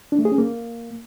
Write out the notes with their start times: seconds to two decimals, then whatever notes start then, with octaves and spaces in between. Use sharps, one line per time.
0.12 D4
0.19 A3
0.25 G#4
0.32 C#4
0.38 A#3